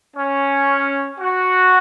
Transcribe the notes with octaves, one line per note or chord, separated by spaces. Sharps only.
C#4
F#4